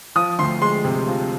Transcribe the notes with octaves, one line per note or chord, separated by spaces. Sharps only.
F3 D#6
D2 C6
G#3 C6
C3
F3